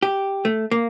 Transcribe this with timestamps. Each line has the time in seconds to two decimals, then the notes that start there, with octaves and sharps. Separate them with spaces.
0.03 G4
0.45 A3
0.71 A#3